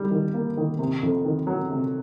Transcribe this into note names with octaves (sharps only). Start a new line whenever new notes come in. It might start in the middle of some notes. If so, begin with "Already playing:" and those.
Already playing: D#3 G3
D#3
A#3
D#3
C3
F2
D#3
F#3
C3